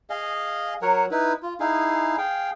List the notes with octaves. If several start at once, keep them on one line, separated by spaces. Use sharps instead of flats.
G#4 D#5 F5
F#3 A#4 C#5 F#5
D#4 E4 B4
F4
D#4 E4 G#4 F5
G#4 F5 G5